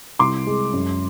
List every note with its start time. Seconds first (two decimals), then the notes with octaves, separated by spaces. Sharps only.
0.19 C2 C6 D6
0.47 G#3
0.73 F#2